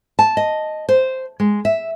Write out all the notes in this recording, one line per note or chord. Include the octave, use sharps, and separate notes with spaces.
A5
D#5
C5
G#3
E5